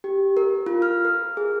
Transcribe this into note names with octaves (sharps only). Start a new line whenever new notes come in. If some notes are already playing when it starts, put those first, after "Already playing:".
G4
A#4
F4
F6
A#4
G#4